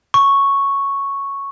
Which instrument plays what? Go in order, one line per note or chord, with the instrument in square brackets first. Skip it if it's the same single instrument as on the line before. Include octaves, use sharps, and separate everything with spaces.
[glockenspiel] C#6